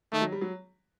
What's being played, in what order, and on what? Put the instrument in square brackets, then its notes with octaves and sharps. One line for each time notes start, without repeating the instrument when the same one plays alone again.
[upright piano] D#3 [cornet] A3
[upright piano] F#3
G3
F#3